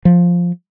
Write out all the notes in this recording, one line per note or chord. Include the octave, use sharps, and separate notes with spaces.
F3